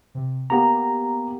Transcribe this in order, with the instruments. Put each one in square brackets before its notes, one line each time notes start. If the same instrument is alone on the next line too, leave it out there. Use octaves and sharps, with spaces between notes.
[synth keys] C3
[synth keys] A#3 B3 G4 [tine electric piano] A#5